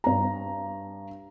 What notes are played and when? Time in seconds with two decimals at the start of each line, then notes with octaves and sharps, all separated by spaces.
0.04 G2 A#5